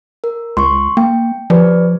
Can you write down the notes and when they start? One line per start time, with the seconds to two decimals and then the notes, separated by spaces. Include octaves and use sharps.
0.24 A#4
0.57 C#2 C6 C#6
0.97 A#3 G5
1.50 F3 G4 B4 D5